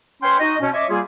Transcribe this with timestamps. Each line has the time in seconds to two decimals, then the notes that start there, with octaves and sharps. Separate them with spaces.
0.22 C#4 B4 C#5 G5 C6
0.40 D#4 F#4 D#5
0.60 B2 C#4
0.74 C#5 D#5 E5 D6
0.89 G3 A#3 F4 G#4